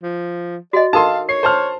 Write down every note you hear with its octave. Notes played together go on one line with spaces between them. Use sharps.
F3
F#4 D5 D#5
D#4 A4 A#4 F5 A5 C6
C#5 C7
C5 A5 F6